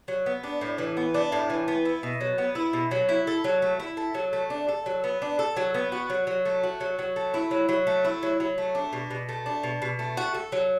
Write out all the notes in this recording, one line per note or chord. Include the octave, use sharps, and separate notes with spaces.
F#3
B3
D4
A2
E3
B3
D4
A2
E3
B3
E4
B2
F#3
B3
E4
B2
F#3
E4
A4
F#3
A3
E4
A4
F#3
A3
D4
A4
F#3
B3
D4
A4
F#3
B3
F#4
F#3
F#3
A3
F#4
F#3
F#3
A3
E4
F#3
F#3
A3
E4
F#3
F#3
A3
D4
B2
B2
A3
D4
B2
B2
A3
F#4
A4
F#3